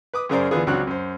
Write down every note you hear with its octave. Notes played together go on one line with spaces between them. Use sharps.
B4 D6 D#6
F#2 C#3 G#4 A#4 C5 D5
D2 E3 B3 F4 G#4
C#2 F#3 C4 D4 F#4 F#6
F#2 C5